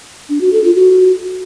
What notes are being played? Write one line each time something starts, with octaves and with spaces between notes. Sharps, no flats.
D4
F#4
A4
F4
F#4